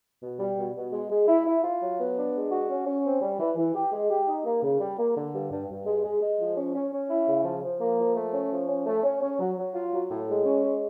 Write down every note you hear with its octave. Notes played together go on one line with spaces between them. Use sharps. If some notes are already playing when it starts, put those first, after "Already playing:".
B2
G3
B2
B2
G#3
G#3
E4
E4
F4
F#3
B3
D4
G#3
F#4
C#4
C#4
C4
G3
E3
E3
G4
G#3
G4
D#4
A#3
C#3
G3
A#3
D3
G2
G2
G2
G#3
G#3
G#3
F3
C#4
C#4
C#4
E4
C#3
F3
F3
A#3
F3
A3
C#4
F3
C#4
A3
C#4
C#4
F#3
F#3
F4
F#3
A2
G#3
C#4
G#3